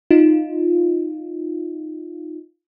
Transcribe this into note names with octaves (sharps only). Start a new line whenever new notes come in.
D#4 F4